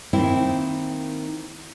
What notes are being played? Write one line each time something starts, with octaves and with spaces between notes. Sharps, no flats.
D#3 A#3 C4 E4